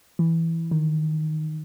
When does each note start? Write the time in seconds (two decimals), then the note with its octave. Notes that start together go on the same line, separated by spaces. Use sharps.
0.19 E3
0.71 D#3